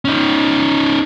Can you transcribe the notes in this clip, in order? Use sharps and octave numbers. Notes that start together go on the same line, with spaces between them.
C#4 D#4